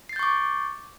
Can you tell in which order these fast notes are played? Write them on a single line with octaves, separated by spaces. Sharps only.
C7 A6 G6 C#6 D6